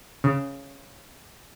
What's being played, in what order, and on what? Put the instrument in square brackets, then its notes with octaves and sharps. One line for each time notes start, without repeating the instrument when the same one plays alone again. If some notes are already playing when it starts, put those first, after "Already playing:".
[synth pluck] C#3